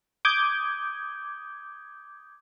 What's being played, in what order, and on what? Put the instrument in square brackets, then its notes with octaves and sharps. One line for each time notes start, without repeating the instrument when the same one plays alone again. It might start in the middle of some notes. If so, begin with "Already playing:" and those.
[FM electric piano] D6 D#6 G6 G#6